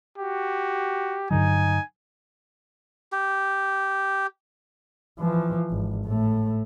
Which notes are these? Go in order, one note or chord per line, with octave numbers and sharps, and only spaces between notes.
F#4 G4
G2 D3 F#3 D#4 G#5
G4
E3 F3
G#1
A2 A3